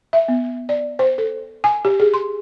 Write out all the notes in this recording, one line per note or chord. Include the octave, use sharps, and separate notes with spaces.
E5
B3
D5
C5
A4
G#5
G4
G#4
C6